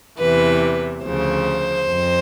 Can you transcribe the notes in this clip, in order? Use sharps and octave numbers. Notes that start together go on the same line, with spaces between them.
E2 C3 E3 B4
D2 C#3 F3 C5
F2